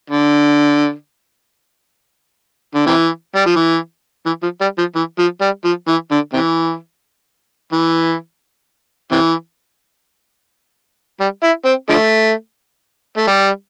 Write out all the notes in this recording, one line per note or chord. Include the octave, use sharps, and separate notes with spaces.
D3
D3
C3 E3
G3
F3
E3
E3
F3
G3
F3
E3
F3
G3
F3
E3
D3
C3 E3
E3
C3 E3
G3
E4
C4
D3 F3 A3
A3
G3